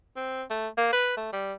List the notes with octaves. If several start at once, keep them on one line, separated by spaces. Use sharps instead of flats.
C4
A3
A#3
B4
A3
G3